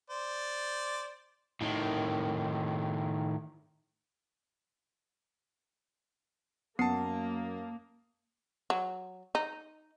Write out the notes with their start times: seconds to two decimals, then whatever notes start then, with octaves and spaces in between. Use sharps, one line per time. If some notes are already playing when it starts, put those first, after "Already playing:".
0.10 C5 D5
1.61 A2 D#3
6.79 F#2 A#3 B3 F#5 A5 D#6 C7
8.70 F#3
9.35 D#4